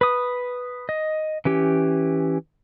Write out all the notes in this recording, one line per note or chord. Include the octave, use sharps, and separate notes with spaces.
B4 D#6
D#5
E3 C#4 G4